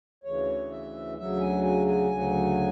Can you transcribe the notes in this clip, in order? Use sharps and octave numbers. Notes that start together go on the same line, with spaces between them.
D2 C#3 E3 C#5
E5
D2 C#3 F#3 E5
G#5
G#5
G#5
D2 C#3 F#3